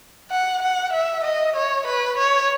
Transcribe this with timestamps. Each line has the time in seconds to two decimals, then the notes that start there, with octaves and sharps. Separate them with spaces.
0.31 F#5
0.62 F#5
0.93 E5
1.24 D#5
1.56 C#5
1.87 B4
2.18 C#5